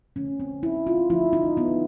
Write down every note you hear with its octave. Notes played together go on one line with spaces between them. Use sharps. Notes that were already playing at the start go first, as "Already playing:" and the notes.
D3 F3 A3 C#4
C4
E4
F4
D3 F3 A3 E4
D#4
B3